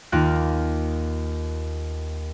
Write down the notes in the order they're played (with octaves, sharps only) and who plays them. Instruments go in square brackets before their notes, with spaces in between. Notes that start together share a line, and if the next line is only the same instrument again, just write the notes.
[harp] D#2 A#3 F4 F#6